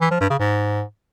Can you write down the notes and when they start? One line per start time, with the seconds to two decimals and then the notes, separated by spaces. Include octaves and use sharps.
0.01 E3
0.11 F3
0.20 G2
0.30 C#3
0.40 G#2